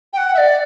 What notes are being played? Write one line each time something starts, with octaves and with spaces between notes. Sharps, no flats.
G5
F#5
E5
D5